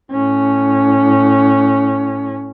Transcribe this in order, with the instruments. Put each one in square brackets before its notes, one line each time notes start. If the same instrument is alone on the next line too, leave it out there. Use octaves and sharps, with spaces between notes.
[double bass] A2 C#4